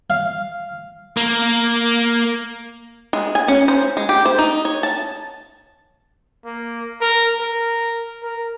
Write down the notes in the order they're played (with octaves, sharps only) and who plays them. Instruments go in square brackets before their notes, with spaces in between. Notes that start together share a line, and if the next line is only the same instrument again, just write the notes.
[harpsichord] F5
[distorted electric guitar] A#3
[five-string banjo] G#3
G#5
C#4
C5
G#3
G4
C5
D#4
C#5
A5
[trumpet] A#3
A#4
A#4
A#4